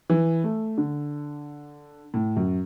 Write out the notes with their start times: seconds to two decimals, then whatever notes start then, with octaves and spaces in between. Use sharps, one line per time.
0.10 E3
0.44 A3
0.78 D3
2.14 A2
2.36 F#2